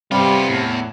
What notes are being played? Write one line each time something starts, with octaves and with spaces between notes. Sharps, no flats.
C3 G3 B3 F4
E2 A2